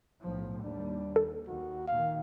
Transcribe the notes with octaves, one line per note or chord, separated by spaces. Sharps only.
B1 A2 F3
D#2 G3 D4
A4
D#2 D#3 F#4
A#2 D#3 F5